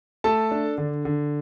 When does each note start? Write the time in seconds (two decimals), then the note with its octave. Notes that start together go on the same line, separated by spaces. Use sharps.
0.24 A3 A4 A5
0.51 D4
0.78 D3
1.05 D3